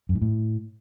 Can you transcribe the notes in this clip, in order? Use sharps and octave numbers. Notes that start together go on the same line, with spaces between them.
F#2
G#2
A2